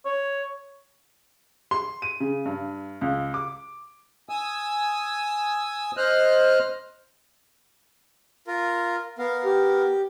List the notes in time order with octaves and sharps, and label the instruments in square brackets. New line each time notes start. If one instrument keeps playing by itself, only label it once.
[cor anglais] C#5
[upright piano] C6
D#7
C#3
G2
C#2
D6
[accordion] G#5 D#6 E6
C5 D#5 F6 F#6
[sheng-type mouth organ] F4 A#4
[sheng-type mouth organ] B3 A#4 [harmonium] F5
[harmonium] G4